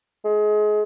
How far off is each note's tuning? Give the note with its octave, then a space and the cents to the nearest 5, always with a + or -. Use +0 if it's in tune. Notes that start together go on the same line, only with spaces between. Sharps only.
G#3 +25